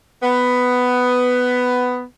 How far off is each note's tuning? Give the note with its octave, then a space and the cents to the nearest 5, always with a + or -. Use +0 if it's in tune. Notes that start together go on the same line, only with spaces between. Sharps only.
B3 +10